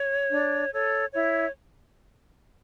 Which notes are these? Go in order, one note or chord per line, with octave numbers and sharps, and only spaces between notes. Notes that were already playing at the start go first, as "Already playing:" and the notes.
Already playing: C#5
D4
A4 C#5
E4 C#5